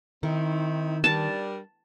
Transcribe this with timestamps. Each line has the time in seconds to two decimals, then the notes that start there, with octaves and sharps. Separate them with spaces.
0.23 D#3 C4 D#4 E4
1.04 G3 D4 A#4 A5